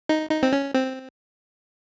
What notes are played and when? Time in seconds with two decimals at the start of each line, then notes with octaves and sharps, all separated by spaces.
0.09 D#4
0.30 D#4
0.43 C4
0.53 C#4
0.74 C4